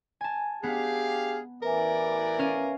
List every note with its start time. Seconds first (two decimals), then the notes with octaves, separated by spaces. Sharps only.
0.21 G#5 A5
0.63 B3 D4 G4 G#4 F5
1.63 A1 E3 A#4 B4 D5 E5 G#5
2.39 C#4 F5 D#7